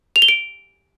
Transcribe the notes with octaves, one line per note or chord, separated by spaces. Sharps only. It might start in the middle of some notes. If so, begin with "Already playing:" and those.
F7
G7
D7